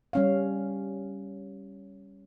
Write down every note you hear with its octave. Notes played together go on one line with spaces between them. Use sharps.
G3 C#4 F5